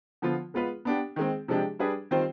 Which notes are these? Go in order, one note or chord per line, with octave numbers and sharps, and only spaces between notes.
D3 F3 B3 F4
G#3 B3 F4 B4
B3 D4 G4
D#3 G#3 C4
C3 F3 G#3 D4 G4
G3 D4 G#4 B4
D#3 G3 C4 F4 C5